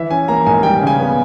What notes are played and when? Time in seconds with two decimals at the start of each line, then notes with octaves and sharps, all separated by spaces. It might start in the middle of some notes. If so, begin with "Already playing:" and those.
Already playing: E3 E5
0.11 C#4 G#5
0.28 A#3 A#5
0.46 G#2 G#5
0.63 G3 G5
0.81 C#3
0.87 G#5
0.99 B3